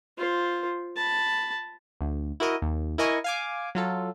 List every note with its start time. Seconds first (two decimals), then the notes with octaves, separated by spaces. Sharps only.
0.18 F4 C5
0.96 A5 B5
2.01 D2
2.40 E4 F#4 A#4 D#5
2.62 D#2
2.98 E4 A#4 D#5 G#5 C#6
3.24 F5 G#5 D6
3.75 F#3 F4 A4